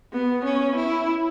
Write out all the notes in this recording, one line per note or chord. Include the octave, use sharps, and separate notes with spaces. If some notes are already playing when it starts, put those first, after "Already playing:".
B3
C#4
E4